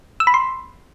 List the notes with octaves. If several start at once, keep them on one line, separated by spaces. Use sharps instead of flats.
E6
B5
C6